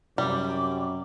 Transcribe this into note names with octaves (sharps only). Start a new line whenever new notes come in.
F#2 C3 G3 D6